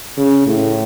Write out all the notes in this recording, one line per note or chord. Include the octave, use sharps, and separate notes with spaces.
C#3
A2